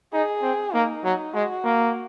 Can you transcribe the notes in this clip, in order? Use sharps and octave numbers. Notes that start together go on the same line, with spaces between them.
D#4 G#4
C4
A#3 D#4
F#3
G#3 F#4
A#3